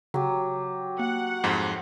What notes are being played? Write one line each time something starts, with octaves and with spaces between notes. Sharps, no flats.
C#3 F#3 G4
A#3 F#5
F2 G#2